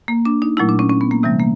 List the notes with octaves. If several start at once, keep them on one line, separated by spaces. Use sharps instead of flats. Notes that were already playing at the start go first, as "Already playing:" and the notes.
A#3
D4
D#4
A#2 F#3 A3 E4
D4
C#4
C#4
B3
A#3
C3 E3 G3 A3
A#3